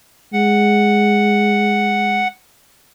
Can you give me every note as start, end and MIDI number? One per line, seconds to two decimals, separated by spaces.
0.33 2.23 56
0.33 2.28 78